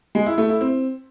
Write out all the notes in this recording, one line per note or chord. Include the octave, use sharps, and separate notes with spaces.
G#3
E4
A3
E4
C4